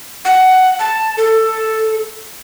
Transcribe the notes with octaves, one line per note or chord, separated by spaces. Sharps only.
F#5
A5
A4